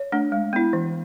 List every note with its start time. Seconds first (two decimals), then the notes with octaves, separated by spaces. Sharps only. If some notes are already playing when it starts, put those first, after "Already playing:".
Already playing: C#5
0.12 A3 D4
0.32 G#3
0.53 B3 E4
0.73 E3